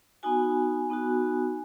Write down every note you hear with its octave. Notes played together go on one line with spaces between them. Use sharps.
B3 D#4 F#4 G#5
B3 D#4 F#4